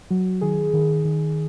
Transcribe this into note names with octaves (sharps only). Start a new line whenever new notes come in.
F#3 F#4
D#3 G#4
D#3
D#3